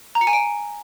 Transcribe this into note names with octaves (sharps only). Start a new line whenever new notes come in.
A#5
C#7
G#5
D7